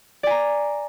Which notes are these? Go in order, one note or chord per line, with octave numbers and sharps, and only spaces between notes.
D5 G#5 A#5